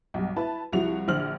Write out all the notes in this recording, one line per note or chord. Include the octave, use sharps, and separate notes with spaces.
B1 G2
E4 B4 A5
C2 F3 E4 F#4 F7
A#1 D3 C5 F6 F#7